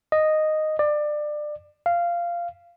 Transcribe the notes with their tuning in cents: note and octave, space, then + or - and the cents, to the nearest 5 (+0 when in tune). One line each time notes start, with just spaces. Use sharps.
D#5 -5
D5 +25
F5 -15